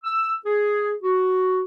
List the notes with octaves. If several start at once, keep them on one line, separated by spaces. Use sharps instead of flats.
E6
G#4
F#4